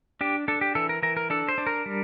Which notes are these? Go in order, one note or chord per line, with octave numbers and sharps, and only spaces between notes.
D4 G4
D4 A4
G4
E3 A4
A#4
E3 A#4
A#4
D4 A4
C5
D4
A#4
G3